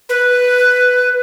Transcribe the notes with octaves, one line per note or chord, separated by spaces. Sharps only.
B4